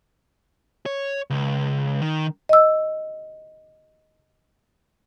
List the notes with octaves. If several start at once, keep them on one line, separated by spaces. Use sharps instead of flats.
C#5
C#2
D#3
D#5 E6